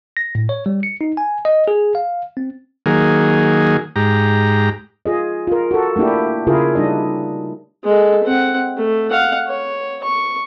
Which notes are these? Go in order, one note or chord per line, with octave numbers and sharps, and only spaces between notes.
A#6
A2
C#5
G3
C#7
D#4
G#5
D#5
G#4
F5
C4
D#3 F#3 A#3 G#4
G#2 G4 A#5
F4 G#4 D#5
F4 A#4
F#4 A4
A3 A#3 D4 E4 G4
C#3 E4 F4 G#4 A#4
G3 D4 D#4 D#5
G#3 A4
C4 F#5
A3
F5 F#5
C#5
C#6